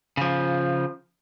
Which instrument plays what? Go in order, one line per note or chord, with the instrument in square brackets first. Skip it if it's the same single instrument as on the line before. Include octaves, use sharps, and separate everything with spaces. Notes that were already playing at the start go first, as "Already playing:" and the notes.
[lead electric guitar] C#3 F3